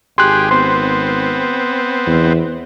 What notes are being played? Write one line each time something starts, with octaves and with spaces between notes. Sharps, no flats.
G#1 G4 G#4 C6 F#6
B3 C4 C6
E2